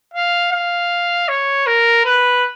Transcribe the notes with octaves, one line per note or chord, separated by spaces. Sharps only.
F5
F5
C#5
A#4
B4